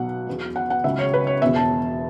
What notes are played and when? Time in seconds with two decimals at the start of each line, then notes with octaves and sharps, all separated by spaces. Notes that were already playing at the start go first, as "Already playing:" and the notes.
Already playing: B1 B2 F#3 F#5
0.27 E2 B2 F#3
0.56 F#5
0.70 F#5
0.84 C#2 C#3 F#3 E5
0.99 C#5
1.14 B4
1.27 C#5
1.41 E1 E2 B2 E5
1.56 A5